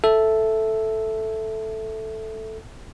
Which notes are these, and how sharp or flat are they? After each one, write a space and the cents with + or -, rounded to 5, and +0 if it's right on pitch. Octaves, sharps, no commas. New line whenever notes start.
A4 +0 E5 +0